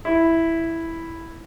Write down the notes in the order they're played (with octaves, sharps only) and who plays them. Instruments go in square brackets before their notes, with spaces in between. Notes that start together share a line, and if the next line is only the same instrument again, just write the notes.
[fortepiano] E4